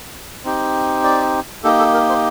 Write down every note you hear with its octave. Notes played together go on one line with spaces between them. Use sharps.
C4 D#4 G4
D5
A#3 D#4 G4 A4
A4
A#4
C5